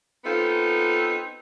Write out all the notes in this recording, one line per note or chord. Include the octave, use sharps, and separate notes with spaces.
B3 C4 D#4 F4 A4